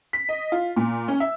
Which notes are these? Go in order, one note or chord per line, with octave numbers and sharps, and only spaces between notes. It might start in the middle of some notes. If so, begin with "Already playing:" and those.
B6
D#5
F4
A#2
C#4
E5